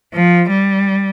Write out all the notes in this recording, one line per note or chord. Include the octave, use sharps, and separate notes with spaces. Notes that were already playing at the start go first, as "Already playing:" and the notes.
F3
G3